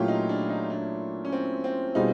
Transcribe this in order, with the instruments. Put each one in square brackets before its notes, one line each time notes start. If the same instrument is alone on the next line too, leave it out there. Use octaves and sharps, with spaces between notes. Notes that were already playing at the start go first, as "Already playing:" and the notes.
Already playing: [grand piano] A#2 F#3 A3 C#4 E4 [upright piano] F4 G4
[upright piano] D#4
D4
D#4
D4
C#4
C4
C4
[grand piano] B2 G3 C4 F4 G#4 [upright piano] D#4